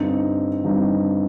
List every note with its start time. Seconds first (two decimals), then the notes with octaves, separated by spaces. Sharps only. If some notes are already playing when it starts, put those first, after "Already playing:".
Already playing: G2 D3 G3 C4 D#4
0.64 G2 D3 G3 C4 D#4